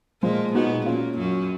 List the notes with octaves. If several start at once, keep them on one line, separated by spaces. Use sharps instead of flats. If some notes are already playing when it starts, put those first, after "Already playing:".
A#2 F3 G#3 A#3
B2 B3 D#4 F#4
A#2 A#3 C#4 F4
F#2 F#3